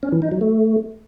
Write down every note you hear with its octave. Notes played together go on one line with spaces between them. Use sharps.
C#4
E3
D#4
F#3
A3